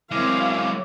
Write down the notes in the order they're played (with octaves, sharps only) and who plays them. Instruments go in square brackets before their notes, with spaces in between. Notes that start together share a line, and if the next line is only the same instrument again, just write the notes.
[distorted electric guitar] F#3 G#3 [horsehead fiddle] C4 F5 [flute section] E4 A#4 D6